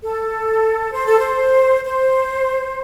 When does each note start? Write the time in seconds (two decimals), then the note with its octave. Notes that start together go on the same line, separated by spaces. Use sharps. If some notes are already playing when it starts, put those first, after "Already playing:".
0.03 A4
0.93 C5
1.07 A4
1.19 C5
1.84 C5